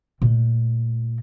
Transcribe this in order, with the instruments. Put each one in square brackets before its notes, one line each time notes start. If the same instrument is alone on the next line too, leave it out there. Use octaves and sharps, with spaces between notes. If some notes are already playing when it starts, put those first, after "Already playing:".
[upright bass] A#2 A3